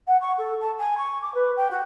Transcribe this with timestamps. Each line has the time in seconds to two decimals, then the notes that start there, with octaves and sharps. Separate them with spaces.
0.07 F#5
0.21 C#6
0.38 A4
0.60 A5
0.78 G#5
0.97 C#6
1.21 D6
1.34 B4
1.56 G5
1.70 F#4